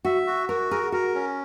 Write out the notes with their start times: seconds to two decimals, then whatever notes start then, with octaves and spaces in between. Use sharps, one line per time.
0.05 F#4 E5
0.27 F#4
0.49 F#4 A#4
0.71 G#4 A#4
0.92 F#4 A#4
1.15 C#4